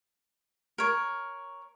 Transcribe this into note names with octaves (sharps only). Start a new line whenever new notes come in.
A#4 C#5